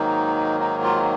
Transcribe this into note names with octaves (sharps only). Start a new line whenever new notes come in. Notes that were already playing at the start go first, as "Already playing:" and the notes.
Already playing: G#2 D#3 F#3 A#3 D#4
D#4
F4